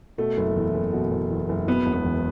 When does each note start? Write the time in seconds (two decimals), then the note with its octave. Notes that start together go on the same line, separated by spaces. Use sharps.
0.18 B2 A3
0.37 F#1
0.56 E2
0.74 F#1
0.93 B2
1.11 F#1
1.30 E2
1.49 F#1
1.67 B2 B3
1.86 E1
1.93 B3
2.05 E2